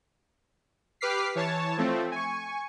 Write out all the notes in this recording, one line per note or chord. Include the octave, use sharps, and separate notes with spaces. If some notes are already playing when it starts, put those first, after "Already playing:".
G4 B4 D6 F6 B6 C7
E3 C#5 A5
F3 A3 C4
G#5 C#6